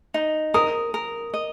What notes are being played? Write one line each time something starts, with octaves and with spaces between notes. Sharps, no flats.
D#4
A#4 D#6
A#4
D#5